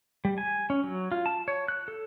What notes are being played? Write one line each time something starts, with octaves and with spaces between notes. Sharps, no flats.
G3
G#5
C#4
F#3
F4
A5
C#5
F#6
A4